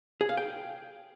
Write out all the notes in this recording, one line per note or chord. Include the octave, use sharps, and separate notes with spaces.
G#4
F5
G5